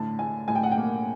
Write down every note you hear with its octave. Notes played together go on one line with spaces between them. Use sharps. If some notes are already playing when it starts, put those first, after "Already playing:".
Already playing: A2 D3 A5
A2 G#5
A2 G#5
G5
F#5
G5
A#3